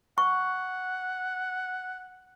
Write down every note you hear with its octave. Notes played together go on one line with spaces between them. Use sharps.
F#5 C#6